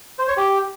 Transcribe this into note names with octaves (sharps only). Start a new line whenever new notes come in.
C5
C#5
G4